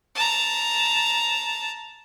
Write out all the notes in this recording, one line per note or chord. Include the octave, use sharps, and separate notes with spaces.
A5 A#5